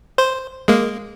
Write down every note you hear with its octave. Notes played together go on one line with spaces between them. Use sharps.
C5
G#3 A#3